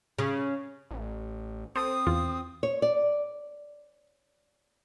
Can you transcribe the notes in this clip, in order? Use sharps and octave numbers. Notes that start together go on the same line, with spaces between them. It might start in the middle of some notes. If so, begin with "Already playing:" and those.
C#3
A1
C4 A4 C5 D#6
E2 F4
C#5
D5